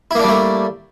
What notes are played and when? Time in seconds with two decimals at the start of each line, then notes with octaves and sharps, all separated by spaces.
0.11 E4
0.15 A#3
0.20 D4
0.24 G3
0.28 A3